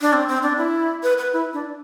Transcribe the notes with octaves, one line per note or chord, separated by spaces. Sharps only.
D4
C4
C4
D4
E4
B4
B4
E4
D4